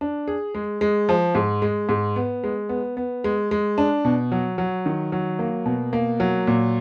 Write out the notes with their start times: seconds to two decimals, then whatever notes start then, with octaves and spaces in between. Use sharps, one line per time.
0.01 D4
0.28 G#4
0.55 G#3
0.81 G#3
1.09 F3
1.35 G#2
1.62 G#3
1.89 G#2
2.16 B3
2.44 G#3
2.69 B3
2.97 B3
3.24 G#3
3.51 G#3
3.78 D4
4.05 B2
4.32 F#3
4.58 F#3
4.86 D#3
5.12 F#3
5.39 A#3
5.66 B2
5.93 A#3
6.20 F#3
6.47 A#2